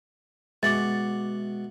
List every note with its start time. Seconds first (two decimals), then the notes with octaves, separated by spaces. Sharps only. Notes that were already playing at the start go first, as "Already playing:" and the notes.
0.63 B2 G#3 E5 F#5 D6 A6